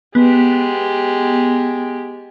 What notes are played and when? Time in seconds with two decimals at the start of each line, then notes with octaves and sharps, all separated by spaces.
0.15 G#3 B3 G4